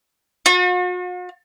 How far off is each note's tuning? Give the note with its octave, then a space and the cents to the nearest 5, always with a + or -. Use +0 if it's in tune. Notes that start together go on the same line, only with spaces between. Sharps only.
F#4 -45